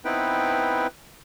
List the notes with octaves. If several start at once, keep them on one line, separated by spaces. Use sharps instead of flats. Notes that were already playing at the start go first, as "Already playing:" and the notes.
B3 C4 D#4 E4 B4 G5